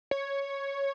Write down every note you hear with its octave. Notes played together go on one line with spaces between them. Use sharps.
C#5